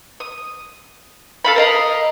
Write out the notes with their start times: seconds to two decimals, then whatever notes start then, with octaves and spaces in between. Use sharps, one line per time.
0.20 D#6
1.44 A4 F5 B5
1.56 A#4 D#5 F5